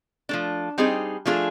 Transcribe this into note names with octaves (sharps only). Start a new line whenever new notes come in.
F3 A3 D4
G3 C4 D#4 G#4
F3 A3 D4 F4 G#4